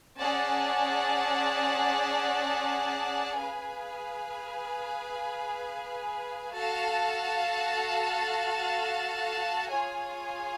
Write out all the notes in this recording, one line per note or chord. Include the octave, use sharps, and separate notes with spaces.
C#4 G#4 D5 F#5 A5
G#4 B4 F5 G#5
F#4 A4 F5 A5
F4 G#4 C#5 G#5